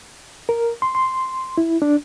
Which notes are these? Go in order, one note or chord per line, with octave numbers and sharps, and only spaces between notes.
A#4
C6
C6
E4
D4